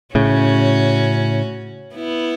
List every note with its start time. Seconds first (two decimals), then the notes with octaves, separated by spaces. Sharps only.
0.15 A2 C#3 C#4 F#4
1.95 B3 E4